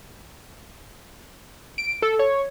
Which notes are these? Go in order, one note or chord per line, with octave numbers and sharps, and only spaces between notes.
D7
A4
C#5